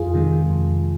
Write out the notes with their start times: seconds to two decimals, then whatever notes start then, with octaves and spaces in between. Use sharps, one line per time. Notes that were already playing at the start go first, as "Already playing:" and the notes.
Already playing: F2 F4 G#4
0.14 C3 D#3 G#3
0.50 F2